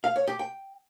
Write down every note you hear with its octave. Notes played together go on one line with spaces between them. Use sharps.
F5
C#5
G4
G5